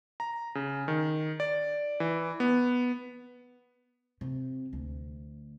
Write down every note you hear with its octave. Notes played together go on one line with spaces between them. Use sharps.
A#5
C#3
D#3
D5
E3
B3
C3
D2